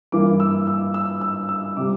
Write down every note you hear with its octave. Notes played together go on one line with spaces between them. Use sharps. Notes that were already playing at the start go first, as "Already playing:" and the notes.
G2 E3 A#3 D6
E6
E6
E6
E6
E6
C3 G3 D6